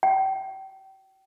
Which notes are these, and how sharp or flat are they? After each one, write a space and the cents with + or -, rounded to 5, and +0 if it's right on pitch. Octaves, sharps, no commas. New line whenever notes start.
G5 -30